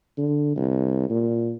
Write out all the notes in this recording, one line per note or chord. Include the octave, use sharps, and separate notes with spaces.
D3
C2
A#2